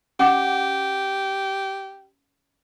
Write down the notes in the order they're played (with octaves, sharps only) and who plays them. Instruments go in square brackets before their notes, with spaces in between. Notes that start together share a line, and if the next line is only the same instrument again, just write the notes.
[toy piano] C#4 F#5 D6 [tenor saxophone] G4